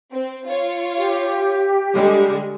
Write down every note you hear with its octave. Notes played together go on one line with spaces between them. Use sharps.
C4
F4 C#5
G4
D3 G3 G#3